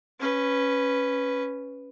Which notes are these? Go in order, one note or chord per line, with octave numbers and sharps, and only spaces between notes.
C#4 B4